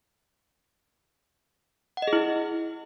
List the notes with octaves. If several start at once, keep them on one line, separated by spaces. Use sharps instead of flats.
F#5
D#5
G#4
E4